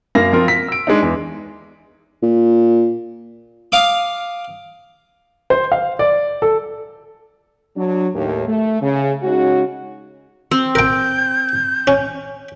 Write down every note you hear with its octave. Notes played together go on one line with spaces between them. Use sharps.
F#2 A#3 F5 A#6
F3 C4 F4 A#4
B6
E6 D7
G#3 D4 D#4
E2
A#2
F5 D6 D#6
C5
F5
D5
A4
F#3 D4
D#2 A2
A3
C#3
C#3 G#3 C#4 D#4 F#4
C4
A#4 G5 G6
C#4